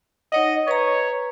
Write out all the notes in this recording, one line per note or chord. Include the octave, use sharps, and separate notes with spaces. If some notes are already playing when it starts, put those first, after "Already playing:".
D#4 C#5 D#5 F#5
B4 C#5 A#5